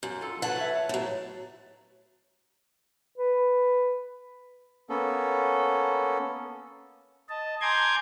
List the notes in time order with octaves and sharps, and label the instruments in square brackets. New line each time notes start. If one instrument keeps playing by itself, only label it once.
[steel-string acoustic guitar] F#2
[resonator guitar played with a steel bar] F4 A4
[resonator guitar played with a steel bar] F#3 B4 [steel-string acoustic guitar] F#5 A5
[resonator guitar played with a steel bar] B4 C#5 E5
[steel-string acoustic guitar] A2 F#3
[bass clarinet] B4
[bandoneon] A#3 B3 C#4 A4
[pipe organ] D#5 A5
G#5 A#5 C6 D6 G6 G#6